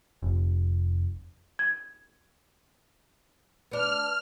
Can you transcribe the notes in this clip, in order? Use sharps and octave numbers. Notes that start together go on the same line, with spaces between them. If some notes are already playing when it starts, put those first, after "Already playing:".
F1
G#6
B3 D4 F6